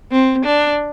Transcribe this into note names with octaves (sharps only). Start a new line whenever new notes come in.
C4
D4